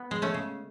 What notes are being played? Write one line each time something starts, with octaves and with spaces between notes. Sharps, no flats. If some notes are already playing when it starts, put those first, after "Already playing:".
Already playing: B3
G#3
A3 C#4
C#3